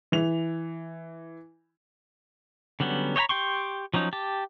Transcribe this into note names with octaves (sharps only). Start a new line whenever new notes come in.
E3 F7
D3 F#3 G3 B3 C#4
C#5 D#5 G5 A#5 B5
G4 G5 C6 C#6
F3 F#3 C#4 D#4
G4 A5